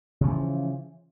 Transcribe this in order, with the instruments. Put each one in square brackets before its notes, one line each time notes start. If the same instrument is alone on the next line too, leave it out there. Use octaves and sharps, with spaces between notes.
[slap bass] C#3
A3
E3
F3